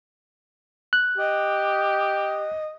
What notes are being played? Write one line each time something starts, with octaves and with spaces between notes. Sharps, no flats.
F#6
G4 D#5